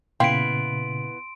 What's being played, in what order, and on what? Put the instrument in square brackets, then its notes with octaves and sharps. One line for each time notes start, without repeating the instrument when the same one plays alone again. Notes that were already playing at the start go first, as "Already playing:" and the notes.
[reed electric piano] A#2 C#3 [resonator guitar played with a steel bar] B3 E4 F5 [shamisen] G5 [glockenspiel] C6 D7